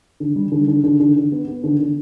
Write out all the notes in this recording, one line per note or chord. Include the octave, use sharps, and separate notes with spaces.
D3
G3
D3
D3
D3
D3
D3
B3
B3
D3
D3